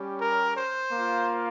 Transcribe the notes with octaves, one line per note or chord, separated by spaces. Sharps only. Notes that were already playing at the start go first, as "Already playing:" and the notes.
Already playing: G3 C#4 G4
A#4
C5
A#3 F4